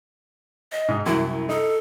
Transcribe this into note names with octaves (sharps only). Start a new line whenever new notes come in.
D#5
G#2 D#4
C2 F#2 E4
D#4 A4